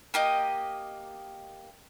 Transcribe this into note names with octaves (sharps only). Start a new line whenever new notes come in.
A#3 G4 D#5